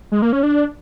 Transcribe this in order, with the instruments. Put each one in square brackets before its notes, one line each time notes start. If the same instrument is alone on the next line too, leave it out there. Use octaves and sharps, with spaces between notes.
[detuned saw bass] G#3
A#3
C#4
D4